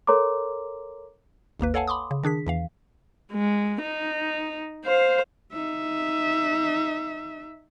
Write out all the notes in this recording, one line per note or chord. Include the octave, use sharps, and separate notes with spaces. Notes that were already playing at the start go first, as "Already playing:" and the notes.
A4 A#4 C#5 A#5 C6 D6
G#1 D#2 A#3 B4
A4 C#5 F5 F#5 G#5 A5
B5 C6 D6 D#6
C#3
D#3 D4 G#4 B6
E2 E3 F5
G#3
D#4
C5 F5
D#4 E5